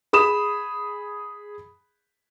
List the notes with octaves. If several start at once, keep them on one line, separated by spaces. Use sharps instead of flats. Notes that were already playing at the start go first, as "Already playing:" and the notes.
G#4 B5 D#6 E7